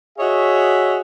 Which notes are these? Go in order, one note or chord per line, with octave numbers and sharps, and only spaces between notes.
F#4 G#4 C#5 D#5 E5